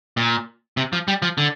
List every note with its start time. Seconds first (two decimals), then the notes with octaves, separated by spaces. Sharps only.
0.17 A#2
0.77 C3
0.93 F3
1.08 G3
1.22 F3
1.38 D3